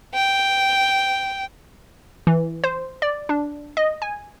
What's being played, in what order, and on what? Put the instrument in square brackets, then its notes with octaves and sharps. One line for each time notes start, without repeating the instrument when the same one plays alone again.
[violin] G5
[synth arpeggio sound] E3
C5
D5
D4
D#5
G#5